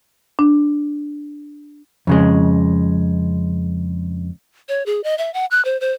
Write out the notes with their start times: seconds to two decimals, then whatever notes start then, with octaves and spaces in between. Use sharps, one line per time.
0.39 D4
2.07 F2 C#3 G#3
4.69 C#5
4.86 G#4
5.04 D#5
5.18 E5
5.34 F#5
5.51 F#6
5.65 C5
5.81 C5